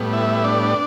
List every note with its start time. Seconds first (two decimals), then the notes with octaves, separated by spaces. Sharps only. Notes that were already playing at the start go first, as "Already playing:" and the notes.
Already playing: A2 G3 B3
0.13 E4 E5
0.44 D4 D5